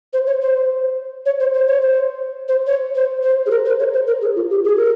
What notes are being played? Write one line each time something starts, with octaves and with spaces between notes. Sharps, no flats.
C5
C#5
C5
C#5
C5
C5
C#5
C5
C5
C#5
C5
C5
G#4
A#4
C5
C#5
C5
A#4
G#4
F4
G4
G#4
A#4